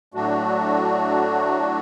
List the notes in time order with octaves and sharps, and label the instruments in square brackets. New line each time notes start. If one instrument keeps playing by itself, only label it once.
[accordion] A2 F#3 A3 D4 F#4